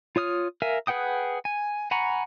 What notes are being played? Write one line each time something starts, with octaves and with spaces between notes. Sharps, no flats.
F4 C#5 D#6 F6
A#4 E5 F5 G#5
G#4 B4 F#5 G5 D#6
G#5
F#5 G#5 A#5 B5 C#6